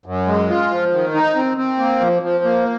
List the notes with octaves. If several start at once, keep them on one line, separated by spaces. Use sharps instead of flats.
F#2
G#3
F4
F3
D#3
D#4
C4
C4
A#3
F3
F3
A#3